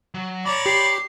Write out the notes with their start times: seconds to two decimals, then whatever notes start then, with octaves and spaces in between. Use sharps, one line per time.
0.14 F#3
0.46 C#5 D5 A#5 B5 D6
0.66 G4 C7